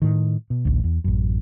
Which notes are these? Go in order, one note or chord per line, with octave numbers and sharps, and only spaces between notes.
A2 D#3
B2
A1 D2
E2
A1 F#2